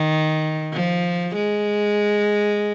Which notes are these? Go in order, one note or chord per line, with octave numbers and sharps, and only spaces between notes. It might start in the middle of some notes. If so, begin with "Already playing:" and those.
Already playing: D#3
F3
G#3